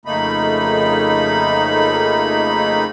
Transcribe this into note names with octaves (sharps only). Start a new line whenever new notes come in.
F2 C#3 A3 A#3 D#4 B5